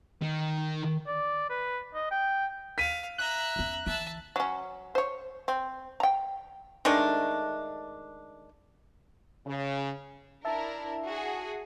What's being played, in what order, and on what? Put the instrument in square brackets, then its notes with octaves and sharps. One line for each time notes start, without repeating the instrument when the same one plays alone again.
[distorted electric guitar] D#3
[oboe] D5
B4
D#5
G5
[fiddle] F5 [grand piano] B6 D#7
[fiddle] E5 A#5 [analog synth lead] F#6
[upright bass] E2 C#4
[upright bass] D3 E3 [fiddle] E5 A5
[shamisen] F#3 C#4
C5 C#5
C4
G5 A#5
[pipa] D#3 G#3 A3 D4
[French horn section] C#3
[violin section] D4 E4 A#4 [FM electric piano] E5 A5
[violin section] F#4 G#4